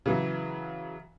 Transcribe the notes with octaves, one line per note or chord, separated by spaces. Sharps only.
C#3 E3 F#3